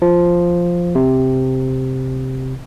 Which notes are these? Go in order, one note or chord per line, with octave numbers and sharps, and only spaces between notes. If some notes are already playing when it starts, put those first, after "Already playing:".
F3
C3